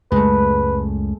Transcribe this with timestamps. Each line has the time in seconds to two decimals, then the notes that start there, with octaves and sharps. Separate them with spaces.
0.12 C#2 F#2 G#3 A3 B4